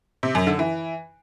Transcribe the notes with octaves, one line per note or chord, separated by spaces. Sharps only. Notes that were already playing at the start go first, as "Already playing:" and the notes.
C3
F#2
D3
E3